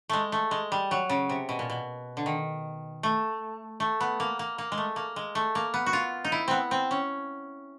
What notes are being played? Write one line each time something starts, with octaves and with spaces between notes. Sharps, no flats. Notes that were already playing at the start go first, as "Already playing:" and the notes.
G#3 A3
A3
G#3
G3
F#3
C#3
C3
B2
A#2
B2
D3
D#3
A3
A3
B3
A#3
A#3
A#3
G#3
A3
A#3
G#3
A3
A#3
B3
F#4
F4
D#4
E4
B3 C4
C4
C#4